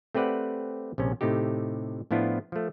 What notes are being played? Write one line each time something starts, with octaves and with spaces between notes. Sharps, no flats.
A3 C4 G4 B4 D5 F#5
A#1 C3 C#4
A2 C3 A3 D#4 G4
A2 F3 B3 D4 E4 F4
F3 A3